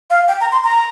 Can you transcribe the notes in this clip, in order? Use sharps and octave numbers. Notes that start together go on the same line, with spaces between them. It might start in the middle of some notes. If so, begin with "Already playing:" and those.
F5
G5
A#5
C6
A#5